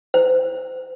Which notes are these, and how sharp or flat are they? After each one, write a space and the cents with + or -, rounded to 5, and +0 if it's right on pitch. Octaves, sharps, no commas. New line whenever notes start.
C5 -30